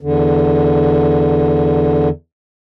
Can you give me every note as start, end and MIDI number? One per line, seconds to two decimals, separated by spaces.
0.01 2.09 40
0.01 2.09 50